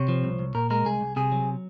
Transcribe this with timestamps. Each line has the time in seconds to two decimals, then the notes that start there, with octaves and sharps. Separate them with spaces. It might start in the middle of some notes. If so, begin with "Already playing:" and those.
Already playing: C3 C#5
0.08 F3
0.24 C2
0.39 C2
0.55 A#2 A#4
0.70 G#3 A#4
0.85 C2 G#4
1.01 C2
1.16 C3 G#4
1.32 F#3